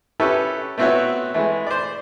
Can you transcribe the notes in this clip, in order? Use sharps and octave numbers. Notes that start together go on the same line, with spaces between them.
C#4 E4 G4 A4 B4
A3 B3 C4 E4 F#4 C#5
E3 G#3 A3
C5 D5